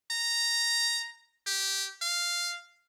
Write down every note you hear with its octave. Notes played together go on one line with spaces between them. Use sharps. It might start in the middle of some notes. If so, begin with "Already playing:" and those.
A#5
G4
F5